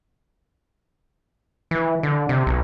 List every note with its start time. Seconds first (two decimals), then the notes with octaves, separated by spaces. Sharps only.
1.71 E3
2.03 D3
2.29 C3
2.46 B1